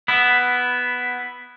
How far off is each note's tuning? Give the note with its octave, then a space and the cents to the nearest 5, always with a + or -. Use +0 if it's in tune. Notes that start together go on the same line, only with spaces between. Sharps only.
B3 +0 E4 +5